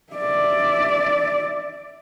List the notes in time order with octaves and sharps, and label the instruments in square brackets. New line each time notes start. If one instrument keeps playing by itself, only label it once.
[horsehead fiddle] D5 E5